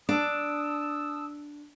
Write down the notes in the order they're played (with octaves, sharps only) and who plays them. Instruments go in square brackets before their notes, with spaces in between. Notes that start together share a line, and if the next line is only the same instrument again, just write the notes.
[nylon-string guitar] D4 [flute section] A5 D#6 E6